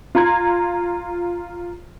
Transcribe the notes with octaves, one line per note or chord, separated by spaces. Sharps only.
F4 A#5 G#6